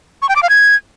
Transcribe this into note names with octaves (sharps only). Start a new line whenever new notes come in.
C#6
G5
D6
F5
G#6